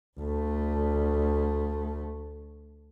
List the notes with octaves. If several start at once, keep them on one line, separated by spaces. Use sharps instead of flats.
D2 A3